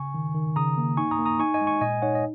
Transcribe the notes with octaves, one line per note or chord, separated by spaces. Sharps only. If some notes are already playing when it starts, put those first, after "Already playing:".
Already playing: C#3 G#5 C#6
D#3
D#3
C#3 A#5 D#6
A#3
D#4 G#5 C#6
A#5 D#6
A#3
A#5 D#6
D#4 G#5 C#6
D#5 G#5
G#3
G#5 C#6
A#2 D#5 G#5
D#4 C#5 F#5
D#5